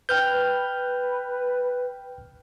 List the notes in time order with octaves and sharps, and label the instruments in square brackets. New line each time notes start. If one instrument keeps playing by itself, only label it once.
[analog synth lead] B4 [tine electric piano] G5 F6 G6